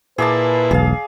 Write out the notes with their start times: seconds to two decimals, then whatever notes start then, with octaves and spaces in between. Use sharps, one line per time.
0.18 A#2 E4 G#4 B4 D5 A5
0.71 E1 B1 G#4 F5